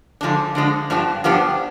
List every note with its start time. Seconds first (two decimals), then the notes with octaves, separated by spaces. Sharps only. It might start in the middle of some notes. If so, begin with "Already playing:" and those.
0.21 D3 F3 G#3 D4
0.55 D3 F3 G#3 D4
0.90 G2 F3 B3 D4 G4
1.24 G2 F3 B3 D4 G4